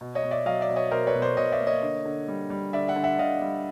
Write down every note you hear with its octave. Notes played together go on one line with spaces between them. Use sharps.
B2
C#5 D#5
B2
D5 E5
F#3 D#5 F5
D5 E5
B2
C#5 D#5
B2 A#4 C5
B4 C#5
B2
C5 D5
B2 C#5 D#5
D5 E5
A#3
C#5 D#5
D3
D3
G3
G3
D3 D5 E5
E5 F#5
D3
E5 F#5
D3 D#5 F5
G3